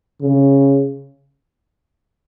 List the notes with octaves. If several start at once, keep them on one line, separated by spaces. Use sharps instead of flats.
C#3